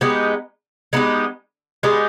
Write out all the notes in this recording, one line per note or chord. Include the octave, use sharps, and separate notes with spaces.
G#3 B3 D#4 G4
G#3 B3 D#4 G4
G#3 B3 D#4 G4